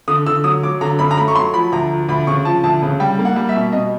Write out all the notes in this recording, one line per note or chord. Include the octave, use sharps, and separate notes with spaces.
D3 D#6
D3 E6
F#3 D#6
F#3 D6
D3 A#5
F#2 B5
A#5
A3 B5
C#6
F#3 C6
F3 B5
D2 A#5
F3
D2 B5
C#3 C#6
F3 A5
D2 A5
C#3
G3 G5
A#3
F#5
G3
E5
B2
B2 D#5